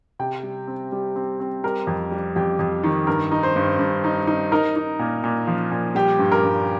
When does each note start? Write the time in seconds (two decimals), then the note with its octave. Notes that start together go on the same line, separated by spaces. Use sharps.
0.19 C3 G5
0.43 G3
0.67 C4
0.92 G3
1.16 C4
1.40 C4
1.64 G3 A#4
1.87 F2
2.11 G3
2.36 F2 G4
2.59 F2
2.83 D#3
3.07 G2 A#4
3.31 D#4
3.43 C5
3.56 G2
3.79 G2
4.04 D#4
4.27 D#4
4.52 D#4 A#4
4.76 D#4
4.99 A#2
5.24 A#2
5.47 F3
5.71 A#2
5.95 G3 G4
6.19 G2
6.32 A#4
6.43 G2